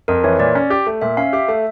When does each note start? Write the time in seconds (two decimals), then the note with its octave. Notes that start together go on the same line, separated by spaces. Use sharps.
0.08 F2 A#4
0.24 E3 C#5
0.39 A#2 D5
0.55 C#4
0.70 G4
0.87 A3
1.02 A#2 E5
1.17 C#4 F5
1.33 G4 E5
1.48 A3 E5